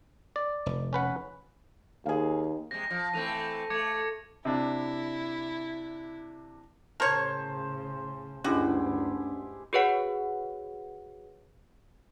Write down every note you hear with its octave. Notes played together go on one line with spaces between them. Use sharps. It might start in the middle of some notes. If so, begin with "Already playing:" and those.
D5
F1
C#4 B4 F#5
D#2 G#4 F5
C3 G#3 A#6
F3
E3 A3 C4 D#7 F7
A3 D6 G#6 C#7
C3 D4 E4
A2 C#3 A#4 C5 C#5 A5
D2 G2 G#3 C#4 D4 E4 F#4 G4
F#4 G#4 B4 C#5 F#5